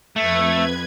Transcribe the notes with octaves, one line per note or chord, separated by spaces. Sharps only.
F2 A3 B4 G#6